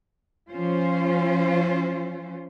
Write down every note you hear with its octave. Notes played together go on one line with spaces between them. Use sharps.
F3 C#4 F4 C5